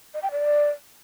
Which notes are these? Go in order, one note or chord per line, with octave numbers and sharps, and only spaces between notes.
D#5
G5
D5